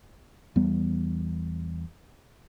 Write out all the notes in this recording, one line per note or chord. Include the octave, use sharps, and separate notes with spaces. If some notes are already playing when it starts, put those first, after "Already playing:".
E2 G3 B3